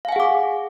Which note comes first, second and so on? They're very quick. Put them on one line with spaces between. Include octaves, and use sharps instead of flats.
F5 G#5 F#5 G#4 D6